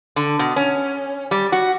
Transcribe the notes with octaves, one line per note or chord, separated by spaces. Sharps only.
D3
B2
C#4
G3
F#4